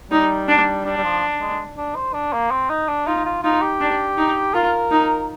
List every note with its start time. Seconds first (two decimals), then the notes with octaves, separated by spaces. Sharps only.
0.11 G3 D#4
0.48 D4
0.85 G3 D4
0.97 G3
1.04 F3
1.41 G#3
1.77 D4
1.96 C5
2.14 D4
2.33 A#3
2.51 C4
2.70 D#4
2.88 D4
3.07 D#4 F4
3.25 F4
3.43 D#4 F4
3.62 G4
3.81 D4
4.18 D#4
4.54 F4 A#4
4.91 D#4